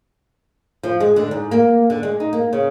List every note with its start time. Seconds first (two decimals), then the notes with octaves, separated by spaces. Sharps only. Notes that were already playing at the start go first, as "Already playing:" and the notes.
0.83 F3
1.00 G#3
1.16 D3
1.31 G#2
1.51 A#3
1.90 D3
2.03 G#3
2.20 D#4
2.33 A#3
2.53 C#3